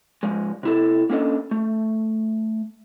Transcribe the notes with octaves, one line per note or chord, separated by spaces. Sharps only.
G#2 F3 G#3
C3 E4 A4
A#3 C#4 D4 A4 D#5
A3